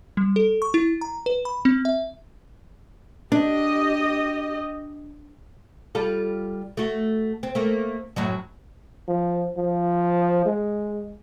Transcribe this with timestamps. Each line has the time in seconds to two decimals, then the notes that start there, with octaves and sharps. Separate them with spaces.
0.17 G3
0.36 A4
0.62 C#6
0.74 E4
1.01 A#5
1.26 B4
1.45 B5
1.65 C4
1.85 E5
3.32 D4 G4 D#5
5.95 G3 F4 A4
6.77 A3 F#4
7.43 C4
7.55 A3 A#3
8.16 F#2 A2 F#3
9.08 F3
9.57 F3
10.45 G#3